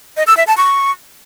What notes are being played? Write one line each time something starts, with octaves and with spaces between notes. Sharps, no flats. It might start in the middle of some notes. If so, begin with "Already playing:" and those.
D#5
E6
E5
A5
C#6